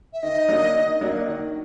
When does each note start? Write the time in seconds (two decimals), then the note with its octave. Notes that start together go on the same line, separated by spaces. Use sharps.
0.13 E5
0.23 D#3 D#5
0.49 F#3 A#3 D4
0.74 D#3
1.01 F#3 A#3 D4
1.27 D#3